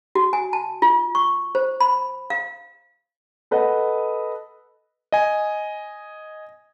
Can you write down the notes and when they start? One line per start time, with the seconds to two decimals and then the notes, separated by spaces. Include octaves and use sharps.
0.15 F#4
0.33 G#5
0.53 A5
0.82 F4
1.15 C#6
1.55 C5
1.80 B5
2.30 F5
3.51 A4 B4 D#5 F#5
5.12 D#5 G#5